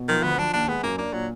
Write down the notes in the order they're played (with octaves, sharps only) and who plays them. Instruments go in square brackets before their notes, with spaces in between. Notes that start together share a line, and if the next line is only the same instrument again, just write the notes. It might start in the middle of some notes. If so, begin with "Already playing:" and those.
Already playing: [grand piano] B2
[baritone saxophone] D#3 [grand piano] F3
[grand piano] D2 [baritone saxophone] B3
[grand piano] F3 [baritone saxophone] D4
[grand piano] D#2 [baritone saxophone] D4
[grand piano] G#3 [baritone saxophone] B3
[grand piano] F#2 [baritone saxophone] A#3
[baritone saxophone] A#3 [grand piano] D4
[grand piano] A#2 [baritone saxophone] F#3